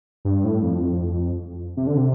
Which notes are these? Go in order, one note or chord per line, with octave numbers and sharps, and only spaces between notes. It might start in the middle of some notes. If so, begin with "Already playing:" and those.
G2
A2
F2
C3
D3
C3